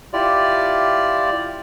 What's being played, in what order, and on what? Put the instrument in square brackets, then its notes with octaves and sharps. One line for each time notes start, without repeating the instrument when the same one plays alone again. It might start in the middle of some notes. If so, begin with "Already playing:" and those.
[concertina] E4 F4 G4 D5